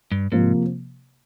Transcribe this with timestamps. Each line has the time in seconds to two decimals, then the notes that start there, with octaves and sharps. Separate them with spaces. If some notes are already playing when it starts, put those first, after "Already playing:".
0.12 G2
0.32 G#2 C3 F3 A#3